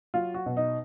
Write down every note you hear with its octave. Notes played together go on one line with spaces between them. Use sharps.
F#3 F4
F#4
B2
D#4